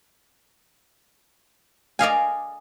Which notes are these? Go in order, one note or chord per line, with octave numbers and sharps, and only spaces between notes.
D5 D#5 F5 G#5